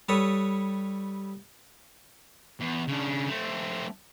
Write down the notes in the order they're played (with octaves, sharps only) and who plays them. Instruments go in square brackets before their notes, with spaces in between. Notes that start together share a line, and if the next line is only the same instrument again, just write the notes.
[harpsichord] G3 A4 B4 C#5 D#6
[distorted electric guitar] E2
C#3 D4
A3 C4